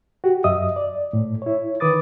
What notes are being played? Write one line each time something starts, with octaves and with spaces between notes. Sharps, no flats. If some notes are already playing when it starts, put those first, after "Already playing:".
F#4 G4
F#2 D#5 E5 D#6
D5
A2
E4 C#5
D#3 B4 D6 D#6 A6